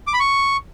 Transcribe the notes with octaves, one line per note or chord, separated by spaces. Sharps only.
D6
B5
C#6